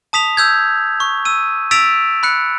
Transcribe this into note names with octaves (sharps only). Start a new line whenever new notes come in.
A5 D#6 B6 F7
E6 G6 G#6
C#6
E6 D#7
E6 A6 B6 D7 E7 F7
B5 F#6 C#7